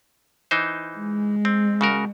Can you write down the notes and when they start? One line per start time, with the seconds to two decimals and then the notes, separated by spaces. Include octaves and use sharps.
0.51 E3 D#4 C5
0.97 G#3
1.45 C4
1.81 C#3 F#4 A#4